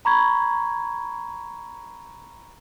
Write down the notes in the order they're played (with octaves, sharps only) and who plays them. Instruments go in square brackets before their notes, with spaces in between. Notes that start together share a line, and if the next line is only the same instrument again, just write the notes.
[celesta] A#5 B5 C#6 G#6